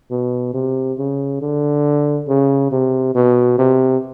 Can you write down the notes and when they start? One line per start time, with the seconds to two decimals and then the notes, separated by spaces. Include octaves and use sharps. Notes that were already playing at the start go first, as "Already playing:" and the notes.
0.11 B2
0.54 C3
0.98 C#3
1.41 D3
2.28 C#3
2.72 C3
3.15 B2
3.58 C3